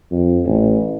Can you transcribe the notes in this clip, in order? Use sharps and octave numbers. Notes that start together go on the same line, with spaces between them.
F2
A1